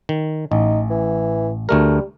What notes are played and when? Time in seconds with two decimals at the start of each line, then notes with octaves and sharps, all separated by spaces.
0.09 D#3
0.52 A1 D#4
0.90 E3
1.69 D2 G3 A3 A#4